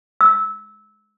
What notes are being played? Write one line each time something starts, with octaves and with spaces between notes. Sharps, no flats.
E6